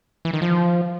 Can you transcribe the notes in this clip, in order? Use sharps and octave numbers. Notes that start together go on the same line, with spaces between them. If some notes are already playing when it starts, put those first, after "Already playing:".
E3
D#3
F3